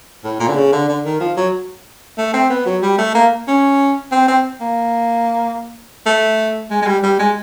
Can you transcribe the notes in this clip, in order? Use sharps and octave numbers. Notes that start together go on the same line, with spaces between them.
A2
A#2
D3
C#3
D3
D3
D#3
F3
F#3
A3
C4
B3
F#3
G3
A3
A#3
C#4
C4
C4
A#3
A3
G#3
G#3
G3
G3
G#3